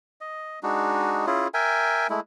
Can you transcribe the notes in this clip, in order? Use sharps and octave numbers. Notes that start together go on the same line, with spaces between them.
D#5
G#3 D4 D#4 F#4
C#4 E4 F4 G#4
A#4 E5 G5 G#5
G#3 A3 E4